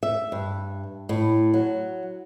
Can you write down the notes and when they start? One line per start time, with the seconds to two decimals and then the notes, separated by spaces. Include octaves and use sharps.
0.03 E5
0.32 G2
1.09 A2
1.54 F#3